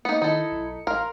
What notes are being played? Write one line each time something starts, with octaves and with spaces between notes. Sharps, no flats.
A#3 B3 D#4 C#7
D#3 D#4 E4 A4
B1
A1 A#4 F5 A#5 C6 F6